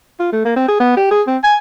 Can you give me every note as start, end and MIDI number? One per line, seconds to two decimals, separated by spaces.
0.20 0.29 65
0.33 0.44 57
0.45 0.53 58
0.56 0.66 60
0.68 0.76 68
0.80 0.92 59
0.97 1.09 67
1.11 1.22 68
1.27 1.37 60
1.44 1.56 80